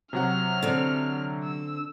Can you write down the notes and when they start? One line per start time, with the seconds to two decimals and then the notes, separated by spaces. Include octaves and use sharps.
0.13 C3 F#3 F#5 F6
0.63 D3 C4
1.44 E6